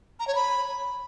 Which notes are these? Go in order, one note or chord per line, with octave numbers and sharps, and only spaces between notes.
A#5
C#5
B5